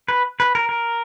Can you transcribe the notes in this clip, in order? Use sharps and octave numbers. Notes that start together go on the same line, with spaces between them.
B4
B4
A#4
A#4